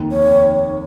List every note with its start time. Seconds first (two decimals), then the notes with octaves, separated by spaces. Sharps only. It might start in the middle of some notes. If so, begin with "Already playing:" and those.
Already playing: F1 D#2 D#3
0.12 C#5